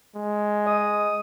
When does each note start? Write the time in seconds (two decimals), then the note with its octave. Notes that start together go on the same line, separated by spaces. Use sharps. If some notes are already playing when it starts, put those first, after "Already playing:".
0.16 G#3
0.66 D#5 D#6